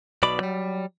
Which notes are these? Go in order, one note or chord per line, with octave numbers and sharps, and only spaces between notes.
B1 B2 D5 B5
F#3 G3